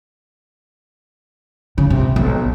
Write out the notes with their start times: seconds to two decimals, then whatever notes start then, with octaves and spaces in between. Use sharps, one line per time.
1.78 C#3
1.90 C3
2.16 B1